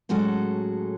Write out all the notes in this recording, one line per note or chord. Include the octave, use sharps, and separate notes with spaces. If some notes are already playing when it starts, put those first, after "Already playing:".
A2 F#3 G#3 C#4 F#4 A4